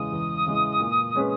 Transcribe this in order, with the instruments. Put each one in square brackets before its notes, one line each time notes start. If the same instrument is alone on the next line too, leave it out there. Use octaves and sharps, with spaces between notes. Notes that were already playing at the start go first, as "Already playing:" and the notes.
Already playing: [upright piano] E2 C#3 E3 G#3 [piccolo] D#6
[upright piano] E2
C#3 E3 G#3
A#2
G#3 C#4 G#4 B4